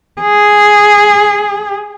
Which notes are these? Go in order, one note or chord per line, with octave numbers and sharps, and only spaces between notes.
G#4